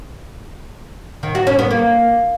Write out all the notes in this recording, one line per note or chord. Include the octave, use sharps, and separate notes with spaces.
D#3
F#4
C#4
B3
A#3